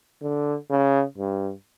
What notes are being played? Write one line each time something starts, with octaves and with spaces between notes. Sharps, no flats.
D3
C#3
G2